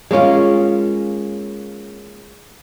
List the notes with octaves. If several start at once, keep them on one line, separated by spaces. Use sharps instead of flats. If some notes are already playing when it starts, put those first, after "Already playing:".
G#3 A#3 C#4 F4